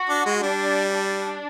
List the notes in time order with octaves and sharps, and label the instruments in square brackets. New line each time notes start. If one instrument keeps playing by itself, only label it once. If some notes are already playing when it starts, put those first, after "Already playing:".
Already playing: [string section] F#4
[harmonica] D4
G#3
[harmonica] G3 [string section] D4
[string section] D4